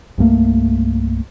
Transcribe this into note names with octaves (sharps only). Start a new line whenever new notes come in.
C2 G2 A3 A#3